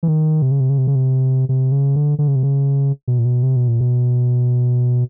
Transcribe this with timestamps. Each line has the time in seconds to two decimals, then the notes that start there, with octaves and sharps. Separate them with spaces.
0.03 E3
0.08 D#3
0.42 C3
0.51 C#3
0.60 C3
0.70 C#3
0.78 C3
0.87 C#3
0.95 C3
1.49 C3
1.72 C#3
1.96 D3
2.19 D3
2.28 C#3
2.36 C3
2.43 C#3
3.08 B2
3.19 A#2
3.25 B2
3.43 C3
3.56 B2
3.68 A#2
3.81 B2